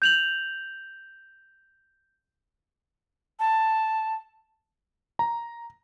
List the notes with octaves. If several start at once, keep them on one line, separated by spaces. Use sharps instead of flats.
G6 F7 F#7
A5
A#5